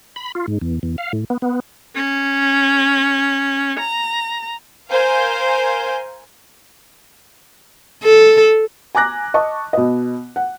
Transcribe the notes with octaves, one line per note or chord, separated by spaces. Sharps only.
B5
F4
G#2
E2
E2
F5
A2
B3
B3
C#4
A#5
A#4 C5 F5 G#5 G6
A4
G#5 A#5 D6 F#6 A#6
D#5 A5 C#6
B2 D#5
F#5